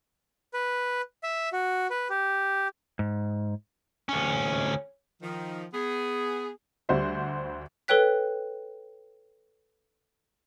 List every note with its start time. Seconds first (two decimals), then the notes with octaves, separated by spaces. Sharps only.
0.54 B4
1.23 E5
1.53 F#4
1.90 B4
2.10 G4
2.99 G#2
4.09 D2 C#4
5.22 D#3 F3
5.74 B3 G#4
6.89 D2 G3 F#4 C5 E5
7.88 A4 B4 C#5 G5 F#6 B6